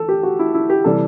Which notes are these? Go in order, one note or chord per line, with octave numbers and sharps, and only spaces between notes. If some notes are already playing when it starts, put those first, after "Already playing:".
Already playing: E3 A4
G4
F#4
E4
E4
G4
C3 E3 G3 A4